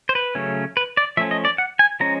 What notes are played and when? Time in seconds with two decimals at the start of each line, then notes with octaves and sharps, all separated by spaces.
0.09 C5
0.15 B4
0.35 C#3 F#3 A3 C#4
0.77 B4
0.97 D5
1.17 F3 A3 C#4 E5
1.31 D#5
1.45 D5
1.58 F#5
1.79 G#5
2.00 F3 G#3 C#4 A#5